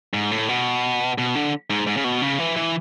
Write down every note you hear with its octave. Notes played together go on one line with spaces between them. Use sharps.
G#2
A2
B2
B2
D3
G#2
G#2
C#3
B2
C#3
E3
E3